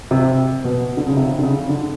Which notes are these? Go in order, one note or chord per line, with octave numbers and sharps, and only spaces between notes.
C3
B2
D3
C#3
C3
D3
C#3
D3